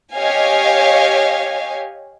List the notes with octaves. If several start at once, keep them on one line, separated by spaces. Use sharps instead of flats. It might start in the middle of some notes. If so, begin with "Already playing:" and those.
G4 C#5 D#5 F5 G#5